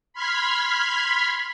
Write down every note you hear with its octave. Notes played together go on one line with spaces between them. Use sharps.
B5 C6 F6 G#6 B6